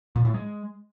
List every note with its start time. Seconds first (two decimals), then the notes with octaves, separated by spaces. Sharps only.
0.16 A#2
0.25 A2
0.34 G#3